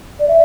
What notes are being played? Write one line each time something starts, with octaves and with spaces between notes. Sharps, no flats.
D5
E5